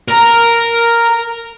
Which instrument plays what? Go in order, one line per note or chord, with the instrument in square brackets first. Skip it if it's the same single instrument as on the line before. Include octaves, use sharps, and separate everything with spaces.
[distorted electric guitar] A#4